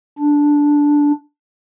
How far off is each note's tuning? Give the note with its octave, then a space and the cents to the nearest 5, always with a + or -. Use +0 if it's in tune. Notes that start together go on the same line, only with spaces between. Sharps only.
D4 -5